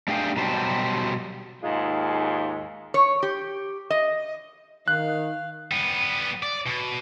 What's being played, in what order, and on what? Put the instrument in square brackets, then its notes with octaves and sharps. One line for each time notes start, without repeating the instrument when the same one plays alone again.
[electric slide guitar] A3 D4 G4 G#4 F5 G5
B2 F#3 G3 G4 C5 A5
[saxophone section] D#2 G#2 G#3 F4
[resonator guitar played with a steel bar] C#5
G4
D#5
[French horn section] D#3 [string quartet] F5 [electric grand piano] F#6
[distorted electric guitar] G3 B3
D5
B2